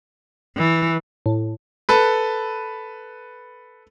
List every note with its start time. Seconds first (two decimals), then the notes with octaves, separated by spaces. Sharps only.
0.57 E3
1.26 A2
1.89 A4 B4